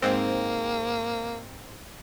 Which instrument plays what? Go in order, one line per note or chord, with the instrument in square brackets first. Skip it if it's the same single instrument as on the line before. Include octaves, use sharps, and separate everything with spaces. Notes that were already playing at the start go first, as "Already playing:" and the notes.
[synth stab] G#2 C4 [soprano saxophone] A#3